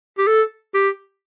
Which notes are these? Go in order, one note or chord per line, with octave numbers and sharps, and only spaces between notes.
G4
A4
G4